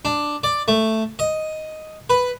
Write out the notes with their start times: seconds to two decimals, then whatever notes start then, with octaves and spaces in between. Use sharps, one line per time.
0.05 D4
0.44 D5
0.68 A3
1.19 D#5
2.10 B4